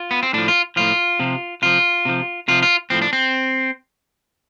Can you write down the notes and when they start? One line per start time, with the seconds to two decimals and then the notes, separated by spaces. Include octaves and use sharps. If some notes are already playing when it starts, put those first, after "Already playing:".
Already playing: F4
0.11 B3
0.23 C4
0.33 A2 F3 D4
0.48 F4
0.76 A2 F3 F4
1.19 C3 F3
1.62 C3 F3 F4
2.05 C3 F3
2.48 C3 F3 F4
2.62 F4
2.90 A2 F3 C4
3.02 D4
3.13 C4